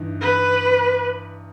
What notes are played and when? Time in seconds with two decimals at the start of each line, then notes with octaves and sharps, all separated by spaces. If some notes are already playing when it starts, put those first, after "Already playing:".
Already playing: G2 E3 D#4
0.21 B4